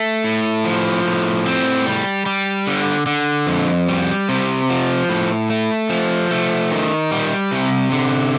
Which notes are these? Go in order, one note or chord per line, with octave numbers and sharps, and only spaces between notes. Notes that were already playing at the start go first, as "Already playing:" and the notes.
Already playing: A3
A2
F3
A2
C4
G3
G3
D3
D3
F2
G3
C3
F3
A2
A3
F3
A3
D#3
G3
C3
D3